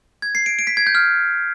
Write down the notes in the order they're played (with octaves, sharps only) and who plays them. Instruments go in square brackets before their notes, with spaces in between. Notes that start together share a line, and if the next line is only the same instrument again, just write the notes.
[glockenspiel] G#6
C7
D7
D7
B6
G#6
G6
F6